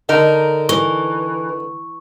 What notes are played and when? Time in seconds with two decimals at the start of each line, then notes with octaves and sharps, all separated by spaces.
0.09 D3 D#4 A#4
0.69 E3 C#6